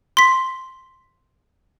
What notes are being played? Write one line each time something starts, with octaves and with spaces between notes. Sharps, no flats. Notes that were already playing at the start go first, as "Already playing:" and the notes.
C6 B6